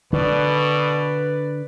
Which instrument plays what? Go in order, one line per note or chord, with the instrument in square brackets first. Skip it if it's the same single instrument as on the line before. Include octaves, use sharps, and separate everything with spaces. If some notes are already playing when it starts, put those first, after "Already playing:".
[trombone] B2 [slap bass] D3 [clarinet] B4 [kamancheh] D5